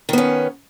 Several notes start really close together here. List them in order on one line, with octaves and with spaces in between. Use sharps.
D#3 B3 C#4